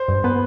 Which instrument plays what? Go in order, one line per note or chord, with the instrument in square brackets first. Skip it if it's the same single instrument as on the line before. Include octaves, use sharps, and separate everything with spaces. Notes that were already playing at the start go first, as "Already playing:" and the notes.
Already playing: [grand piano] C5
[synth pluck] G2
[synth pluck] B3 [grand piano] B4